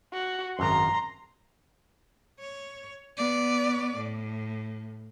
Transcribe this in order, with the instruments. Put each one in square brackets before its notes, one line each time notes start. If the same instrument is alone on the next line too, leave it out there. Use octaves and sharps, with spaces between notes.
[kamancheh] F#4
[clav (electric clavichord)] G#1 F#2 [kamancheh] A#5 C6
[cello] C#5
B3 D5
A2